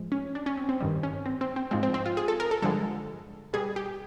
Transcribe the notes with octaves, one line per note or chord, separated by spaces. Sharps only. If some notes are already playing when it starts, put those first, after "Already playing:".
Already playing: A2 F3 G#3
C#4
D4
C#4
C4
C4
G2 D#3 G3
C#4
C4
C4
C4
G#2 F3 G#3 C4
C4
C4
F4
G#4
A4
A#4
A4
G2 D3 F3 G#3 A4
B2 G3 G#4
G4